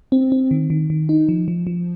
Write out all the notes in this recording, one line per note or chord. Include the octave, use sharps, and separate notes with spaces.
C4
C4
D#3
D#3
D#3
D#4
F3
F3
F3